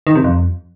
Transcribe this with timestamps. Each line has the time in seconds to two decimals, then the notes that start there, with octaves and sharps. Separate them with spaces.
0.07 D#3
0.15 C3
0.24 F2